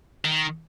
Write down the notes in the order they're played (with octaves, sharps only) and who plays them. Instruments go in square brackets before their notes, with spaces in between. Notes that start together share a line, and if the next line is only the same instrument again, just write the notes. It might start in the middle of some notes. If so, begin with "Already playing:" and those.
[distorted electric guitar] D#3